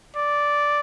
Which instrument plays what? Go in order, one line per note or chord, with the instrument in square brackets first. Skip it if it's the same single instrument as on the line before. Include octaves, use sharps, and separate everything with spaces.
[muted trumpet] D5